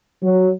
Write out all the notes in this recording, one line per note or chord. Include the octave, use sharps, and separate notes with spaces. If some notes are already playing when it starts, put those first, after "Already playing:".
F#3